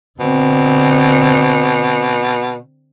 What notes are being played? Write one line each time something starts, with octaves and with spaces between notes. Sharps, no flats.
B2 D3 C4